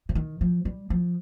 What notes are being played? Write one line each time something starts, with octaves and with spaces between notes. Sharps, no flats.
C#3
D#3
F3
G3
F3